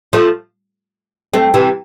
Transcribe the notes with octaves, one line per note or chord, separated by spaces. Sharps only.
F3 A3
A3 C4
C3 E3